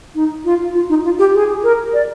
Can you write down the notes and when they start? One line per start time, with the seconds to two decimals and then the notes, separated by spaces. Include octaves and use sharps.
0.15 D#4
0.45 F4
0.74 F4
0.89 D#4
1.04 F4
1.19 G4
1.34 G#4
1.64 A#4
1.94 D5